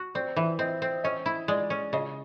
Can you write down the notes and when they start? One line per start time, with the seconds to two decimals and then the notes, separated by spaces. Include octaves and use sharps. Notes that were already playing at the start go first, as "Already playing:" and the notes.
Already playing: F#4
0.15 C4 D5
0.36 E3 E5
0.59 C4 D#5
0.82 C4
1.04 C#4 D#5
1.26 E4
1.48 G#3 D5
1.70 C#4
1.93 C#3 D#5